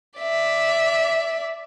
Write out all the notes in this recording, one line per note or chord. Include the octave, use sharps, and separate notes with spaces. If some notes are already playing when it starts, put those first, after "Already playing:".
D5 E5